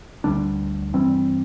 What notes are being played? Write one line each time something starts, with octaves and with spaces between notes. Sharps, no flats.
D2 D3 G3 D4
G2 E3 G3 C4